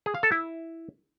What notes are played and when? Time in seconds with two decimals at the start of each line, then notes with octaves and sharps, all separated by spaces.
0.06 G#4
0.15 F5
0.23 A4
0.32 E4